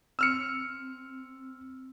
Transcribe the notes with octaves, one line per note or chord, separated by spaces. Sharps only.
C4 E6 F6 C#7